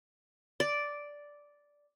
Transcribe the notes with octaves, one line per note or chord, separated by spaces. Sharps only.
D5